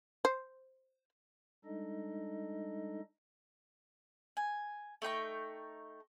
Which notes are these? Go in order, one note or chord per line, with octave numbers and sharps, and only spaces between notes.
C5
G3 G#3 D4 D#4 A4 D#5
G#5
A3 D#4 G5 C#6